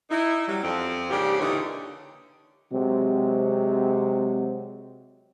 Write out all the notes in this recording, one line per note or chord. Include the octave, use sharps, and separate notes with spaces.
D#4 E4
F#3 G3
F2 F3 C4
G#2 C#3 A#3 D4 G4
A#2 D3 E3 D#4 G4 C#5
C3 F#3 G#3 C4